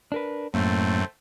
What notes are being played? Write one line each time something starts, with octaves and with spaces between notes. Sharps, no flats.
D4 A#4 B4
F#2 A2 A3 A#3 C4